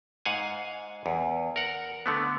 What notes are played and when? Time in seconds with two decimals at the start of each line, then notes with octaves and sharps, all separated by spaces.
0.25 G#2 F5 F#5 G#5
1.06 E2
1.56 A#4 F#5
2.06 D3 A3 B3